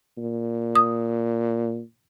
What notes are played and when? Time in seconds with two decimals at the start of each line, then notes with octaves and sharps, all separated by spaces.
0.18 A#2
0.75 D#6